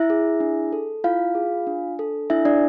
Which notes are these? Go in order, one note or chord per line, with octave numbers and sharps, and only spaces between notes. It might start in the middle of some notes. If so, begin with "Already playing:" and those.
Already playing: E4 E5
G#4
D4
A4
E4 F4 F5
G#4
D4
A4
D4 E4 E5
D4 D5